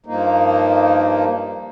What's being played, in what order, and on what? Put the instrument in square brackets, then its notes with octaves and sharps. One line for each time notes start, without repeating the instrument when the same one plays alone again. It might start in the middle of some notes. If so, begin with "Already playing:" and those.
[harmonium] G2 F3 A#3 D#4